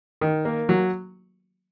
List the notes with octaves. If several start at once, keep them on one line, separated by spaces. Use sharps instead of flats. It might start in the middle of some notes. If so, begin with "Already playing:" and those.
D#3
A#3
F#3